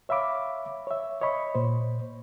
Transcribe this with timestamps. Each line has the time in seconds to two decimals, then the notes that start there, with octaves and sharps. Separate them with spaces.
0.09 C#5 E5 F5 B5 D6
0.87 C#5 E5
1.22 C#5 D#5 B5 C#6
1.55 A#2 C5